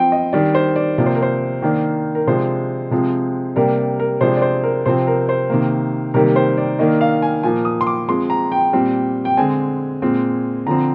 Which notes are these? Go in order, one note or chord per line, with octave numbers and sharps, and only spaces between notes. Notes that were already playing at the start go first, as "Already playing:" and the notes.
Already playing: F3 C4 G5
D#5
D#3 G3 D4 D5
C5
D5
C3 F3 A#3 D5
C5
A#4
C5
D#3 A#3 D4
A#4
C3 F3 G#3 D4 C5
C3 F3 G#3 C4
C3 G3 A#3 D4 A#4
A#4
C3 F3 G#3 D4 C5
D5
C5
A#4
C3 F3 C4 C5
A#4
C5
C3 D#3 A#3
C3 D#3 G3 A#3 A#4
C5
D5
D#3 A#3 D4 D#5
F5
G#5
A#2 F3 A#3 G#5
D#6
C6
D6
F3 G#3 C4 C6
A#5
G5
A#2 G3 C4
G5
D3 G#3 C4 G#5
A#2 G#3 C4
D3 F3 C4 A#5